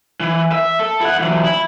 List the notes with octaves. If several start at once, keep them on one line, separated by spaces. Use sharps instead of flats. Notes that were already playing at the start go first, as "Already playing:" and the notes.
E3
E5
A4
E4 F#5
E3 F#3
E4